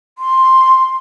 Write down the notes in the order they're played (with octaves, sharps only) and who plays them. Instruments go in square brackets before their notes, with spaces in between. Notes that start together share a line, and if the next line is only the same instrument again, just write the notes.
[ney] C6